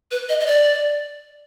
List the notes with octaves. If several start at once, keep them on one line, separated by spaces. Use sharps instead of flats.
B4
D#5
D#5
D5